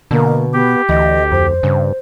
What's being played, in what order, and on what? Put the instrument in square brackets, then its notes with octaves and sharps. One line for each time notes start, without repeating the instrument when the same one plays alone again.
[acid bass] B2 [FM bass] D3 [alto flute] A#3
[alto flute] B3 [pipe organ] G4
[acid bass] D2 [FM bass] E3 [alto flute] D#5
[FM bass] F2 [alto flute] C5
[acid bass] G2 [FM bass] C#3